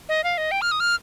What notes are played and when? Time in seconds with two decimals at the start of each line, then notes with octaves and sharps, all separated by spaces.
0.09 D#5
0.24 F5
0.38 D#5
0.51 G5
0.62 F6
0.71 D#6
0.80 F6